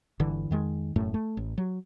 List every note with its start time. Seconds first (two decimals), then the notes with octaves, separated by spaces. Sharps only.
0.20 G1 D3 E3
0.51 F2 D#3 G#3
0.96 E1 F#2 A2 A3
1.14 A3
1.37 A1
1.58 F#3